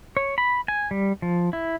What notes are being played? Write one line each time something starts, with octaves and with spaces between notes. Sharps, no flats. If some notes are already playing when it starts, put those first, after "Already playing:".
C#5
B5
G#5
G3
F3
E4